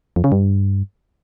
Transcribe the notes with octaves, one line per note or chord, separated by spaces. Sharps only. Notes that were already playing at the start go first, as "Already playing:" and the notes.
F2
C#3
G2